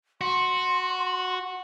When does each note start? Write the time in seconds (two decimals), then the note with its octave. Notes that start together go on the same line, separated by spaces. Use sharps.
0.21 F#4 C6